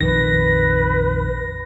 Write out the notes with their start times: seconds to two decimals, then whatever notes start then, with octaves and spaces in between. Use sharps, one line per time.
0.01 A#1 F2 D#3 B4 A#6